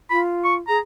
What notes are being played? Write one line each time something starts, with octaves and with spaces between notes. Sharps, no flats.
F4 B5
C#6
G#4 A#5